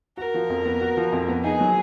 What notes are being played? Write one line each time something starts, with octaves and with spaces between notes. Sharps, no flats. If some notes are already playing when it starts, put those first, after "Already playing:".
F#4 A#4
F3
F2
B3
F#4
F3
F2
B3
D#4 G#4
F#3